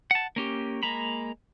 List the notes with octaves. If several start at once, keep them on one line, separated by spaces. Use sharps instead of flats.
F#5 A5
A#3 C#4 G4
G#3 A#3 A#5 B5